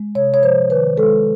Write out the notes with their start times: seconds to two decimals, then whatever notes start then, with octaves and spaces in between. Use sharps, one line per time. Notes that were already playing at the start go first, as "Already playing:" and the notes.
Already playing: G#3
0.15 C3 C#5
0.34 C#5
0.42 F3 C5
0.70 D#3 B4
0.97 G#3 A4